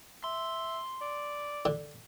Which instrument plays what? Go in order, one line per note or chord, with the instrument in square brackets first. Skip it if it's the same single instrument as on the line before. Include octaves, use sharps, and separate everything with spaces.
[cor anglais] E5 [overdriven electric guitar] C6
[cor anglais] D5
[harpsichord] D3